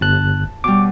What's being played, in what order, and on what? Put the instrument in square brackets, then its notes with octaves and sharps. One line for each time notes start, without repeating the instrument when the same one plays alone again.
[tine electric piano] G1 F#6 [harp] A5
[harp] B2 G3 [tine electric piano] D6